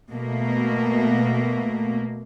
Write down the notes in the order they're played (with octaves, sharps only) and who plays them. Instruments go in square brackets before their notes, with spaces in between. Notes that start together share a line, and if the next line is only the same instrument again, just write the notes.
[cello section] B2 A3 A#3